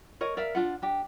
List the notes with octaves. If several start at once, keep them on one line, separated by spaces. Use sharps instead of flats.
A#4 C#5 D#5
A#4 D5 E5 F5
D4 F4 F#5
D4 G4